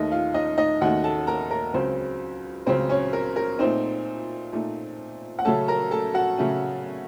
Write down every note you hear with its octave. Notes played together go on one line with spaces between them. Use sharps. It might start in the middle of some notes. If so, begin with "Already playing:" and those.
Already playing: D#2 D#3 A3 D#4 D#5
F4 F5
D#4 D#5
D#4 D#5
D#2 D#3 A3 D#4 F#4 F#5
A4 A5
A#4 A#5
A#4 A#5
C#2 C#3 F#3 C4 C5
C#2 C#3 F#3 C4 C5
C#4 C#5
A#4
A#4
A#2 A3 C4 D#4 C5
A#2 A3 D#4
F#5
C#3 F#3 A3 C#4 A4 A5
A#4 A#5
A4 A5
F#4 F#5
C#3 F#3 A3 C#4